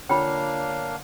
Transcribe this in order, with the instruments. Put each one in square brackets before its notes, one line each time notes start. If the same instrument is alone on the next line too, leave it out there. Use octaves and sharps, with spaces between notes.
[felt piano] D3 F4 [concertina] A#3 D4 F5 [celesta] C#5 [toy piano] G5 B5